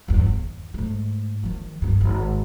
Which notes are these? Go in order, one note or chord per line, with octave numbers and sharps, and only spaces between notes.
G1 E2
D#2
G#2 A3
D#3 F3
F#1 G2
G#1